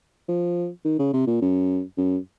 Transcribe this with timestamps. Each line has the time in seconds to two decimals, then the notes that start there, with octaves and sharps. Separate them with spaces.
0.29 F3
0.85 D#3
0.99 C#3
1.13 C3
1.27 A#2
1.42 F#2
1.97 F#2